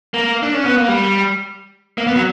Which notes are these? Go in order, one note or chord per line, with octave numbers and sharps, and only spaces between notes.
A#3
D4
C#4
B3
A#3
G3
A#3
B3
F#3